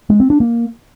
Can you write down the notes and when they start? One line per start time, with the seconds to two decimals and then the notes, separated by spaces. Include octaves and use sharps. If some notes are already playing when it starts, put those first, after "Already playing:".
0.10 G#3
0.20 C4
0.30 D4
0.40 A#3